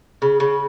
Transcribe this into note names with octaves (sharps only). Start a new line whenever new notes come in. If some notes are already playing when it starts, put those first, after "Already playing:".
C#3
C#3